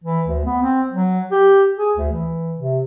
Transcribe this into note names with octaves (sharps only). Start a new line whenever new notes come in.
E3
D2
B3
C4
F#3
G4
G#4
D2
E3
C3